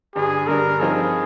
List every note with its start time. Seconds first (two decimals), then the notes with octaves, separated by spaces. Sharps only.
0.15 G2 D3 G3 D4 G#4
0.48 G2 D3 G3 D4 A#4
0.80 G2 F3 C4 D#4 G#4